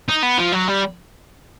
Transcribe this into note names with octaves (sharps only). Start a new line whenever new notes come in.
D#4
B3
F3
F#3
G3